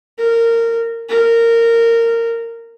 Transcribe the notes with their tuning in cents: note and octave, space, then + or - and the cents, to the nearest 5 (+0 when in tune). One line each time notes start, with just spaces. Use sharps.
A#4 -20
A#4 -15